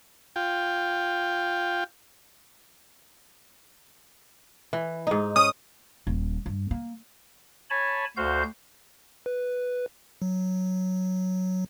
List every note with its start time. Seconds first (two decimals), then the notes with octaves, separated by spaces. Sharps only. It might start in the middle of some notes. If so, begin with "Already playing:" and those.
0.36 F4 G5
4.73 E3
5.07 G#2 D#4
5.36 C#4 D#6
6.07 D#1
6.46 G2
6.71 A#3
7.70 C#5 G#5 A5 B5
8.17 D2 F#4 C5 F5 G6
9.26 B4
10.22 F#3